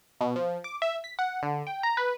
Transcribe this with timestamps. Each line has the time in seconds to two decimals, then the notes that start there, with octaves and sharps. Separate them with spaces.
0.21 B2
0.36 F3
0.64 D6
0.82 E5
1.04 B6
1.19 F#5
1.43 D3
1.67 G5
1.83 A#5
1.97 B4